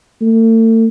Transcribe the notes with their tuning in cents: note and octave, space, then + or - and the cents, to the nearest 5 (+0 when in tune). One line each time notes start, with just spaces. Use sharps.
A3 +40